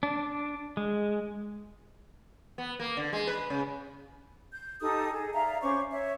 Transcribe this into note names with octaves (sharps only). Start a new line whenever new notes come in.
D4
G#3
B3
A#3
D3
G#3
B4
C#3
G6
D#4 G4 A4 D#6
G#4 A4
D5 E5 F5 A#5
C#4 C5 C#6 D6
C#5 E5